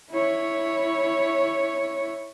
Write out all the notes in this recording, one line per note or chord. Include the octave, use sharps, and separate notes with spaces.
E4 C#5